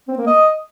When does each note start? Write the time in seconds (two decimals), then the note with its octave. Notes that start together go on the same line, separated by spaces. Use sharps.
0.08 C4
0.18 A#3
0.27 D#5